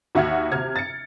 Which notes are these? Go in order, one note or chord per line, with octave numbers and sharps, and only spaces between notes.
D#2 F#4 E5 F#5 F6 G#6
C3 F6 G#6
A6 C#7